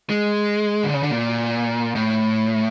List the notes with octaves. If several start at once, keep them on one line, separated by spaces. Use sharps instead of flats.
G#3
D3
C#3
D3
A#2
A2